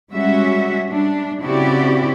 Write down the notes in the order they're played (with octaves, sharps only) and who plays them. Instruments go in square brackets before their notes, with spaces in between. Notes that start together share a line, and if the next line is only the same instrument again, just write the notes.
[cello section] G3 G#3 C#4 F#4 E5
G3 D4
C#3 C4 E4 F#4 G4 D5